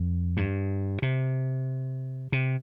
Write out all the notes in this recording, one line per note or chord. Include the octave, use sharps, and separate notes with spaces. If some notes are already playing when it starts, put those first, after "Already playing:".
Already playing: F2
G2
C3
C3